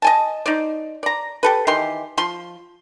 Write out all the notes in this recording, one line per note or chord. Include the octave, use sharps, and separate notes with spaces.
D#5 G#5 A5
D#4 C5 D5
D5 A#5
G4 A4 B4
D#3 E3 G4 C6
F3 C6